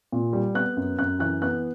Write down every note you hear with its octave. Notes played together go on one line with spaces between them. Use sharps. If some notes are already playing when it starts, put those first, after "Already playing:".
A#2
G3
B3 F#6
F#2
F#2 F#6
E3 F#6
B3 F#6